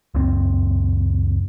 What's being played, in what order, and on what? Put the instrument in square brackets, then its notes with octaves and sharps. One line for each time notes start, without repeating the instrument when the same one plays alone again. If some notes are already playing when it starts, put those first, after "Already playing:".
[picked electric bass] C#2 F#2 C4